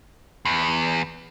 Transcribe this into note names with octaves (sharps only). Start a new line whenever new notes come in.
E2